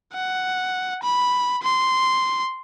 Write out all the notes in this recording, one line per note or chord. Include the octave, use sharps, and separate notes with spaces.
F#5
B5
C6